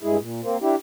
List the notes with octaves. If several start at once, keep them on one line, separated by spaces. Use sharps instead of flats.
G2 G#3 E4 G#4
A#2
A#3 C4
D4 E4 G4